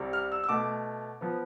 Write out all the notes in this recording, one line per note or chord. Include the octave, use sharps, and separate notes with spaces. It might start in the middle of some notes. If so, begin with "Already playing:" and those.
Already playing: C2 C3 G3
F6
E6
E6
B2 A3 D6
F3 B3